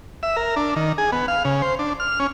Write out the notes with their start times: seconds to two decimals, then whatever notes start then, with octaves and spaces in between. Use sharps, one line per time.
0.23 E5
0.36 A#4
0.56 D4
0.76 D#3
0.98 G#4
1.12 B3
1.28 F5
1.45 C#3
1.62 C5
1.79 D4
2.00 F6
2.20 C#4